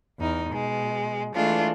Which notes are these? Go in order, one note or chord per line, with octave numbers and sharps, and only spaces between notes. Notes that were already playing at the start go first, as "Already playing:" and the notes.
E2 D#4
B2 G#3
E3 G#3 A3 D4 F4